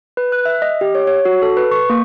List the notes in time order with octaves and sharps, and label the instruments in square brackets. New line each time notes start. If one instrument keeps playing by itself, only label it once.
[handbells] B4
F#6
E5
D#5
G4
C#5
C#5
F#4
A4
B4
C#6
A#3